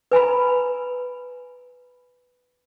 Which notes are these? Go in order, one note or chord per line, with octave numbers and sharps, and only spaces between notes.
B4 G#5 A#5 B5